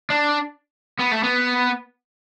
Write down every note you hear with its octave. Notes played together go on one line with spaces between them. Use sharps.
D4
B3
A3
B3